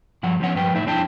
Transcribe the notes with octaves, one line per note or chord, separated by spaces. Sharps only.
G2 F3 F#5
F3 B3 C#4 F#5
G2 F3 B4 G5
F2 A2 D#4 E5
F2 C4 D4 E4 G5 A5